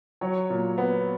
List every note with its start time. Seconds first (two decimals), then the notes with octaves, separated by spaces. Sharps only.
0.21 F#3 C#5
0.50 A#2
0.78 B3